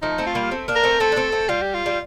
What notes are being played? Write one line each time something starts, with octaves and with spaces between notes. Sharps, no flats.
F3 A3 D#4
A3 C4
F4
G3 A#3
A3 C4
A#3 D4
A#4
A3 C4
A3 C4 A4
D4
A3 C4
A3 C4
G3 F4
G4
F4
G3